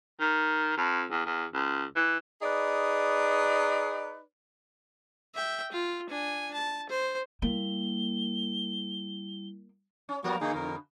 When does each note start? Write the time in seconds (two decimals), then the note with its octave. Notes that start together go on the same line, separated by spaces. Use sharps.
0.21 D#3
0.77 F2
1.11 E2
1.26 E2
1.54 C#2
1.96 E3
2.42 D#4 G#4 B4 D5
5.35 E5 G5
5.72 F4
6.10 D4 G#5
6.54 A5
6.89 C5
7.42 G3 A#3 E4 G7
10.09 C#4
10.24 F3 G3 A#3 B3 F#4 A#4
10.41 B2 D3 A#3 D#4 G#4
10.55 F2 A#4